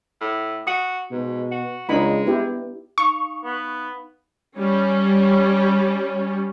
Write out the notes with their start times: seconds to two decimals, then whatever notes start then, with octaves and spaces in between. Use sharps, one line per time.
0.21 A2
0.67 F#4 D#6
1.11 G#2 B2
1.51 F#4
1.89 C#2 G#3 D4 D#4 B5
2.26 B3 E4 G4
2.98 D#4 F5 C#6
3.44 B3
4.58 G3 C#4